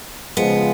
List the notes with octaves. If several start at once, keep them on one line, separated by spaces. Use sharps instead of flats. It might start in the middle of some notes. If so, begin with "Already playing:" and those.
C#3 F3 G#3 B3